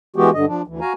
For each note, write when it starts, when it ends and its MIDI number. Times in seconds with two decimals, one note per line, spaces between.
0.16 0.30 52
0.16 0.30 56
0.16 0.30 59
0.16 0.30 66
0.16 0.30 67
0.34 0.45 43
0.34 0.45 50
0.34 0.45 75
0.47 0.62 53
0.47 0.62 62
0.67 0.80 38
0.67 0.80 52
0.81 0.93 66
0.81 0.93 77
0.81 0.93 80
0.81 0.93 82